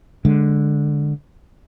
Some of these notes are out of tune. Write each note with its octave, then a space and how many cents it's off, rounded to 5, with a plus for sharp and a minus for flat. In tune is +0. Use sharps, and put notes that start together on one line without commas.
D3 +0 G#3 +0